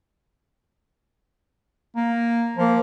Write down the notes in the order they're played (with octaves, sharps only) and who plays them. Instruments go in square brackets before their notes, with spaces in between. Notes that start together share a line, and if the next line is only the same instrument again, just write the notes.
[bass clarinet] A#3
[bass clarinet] F3 [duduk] A#3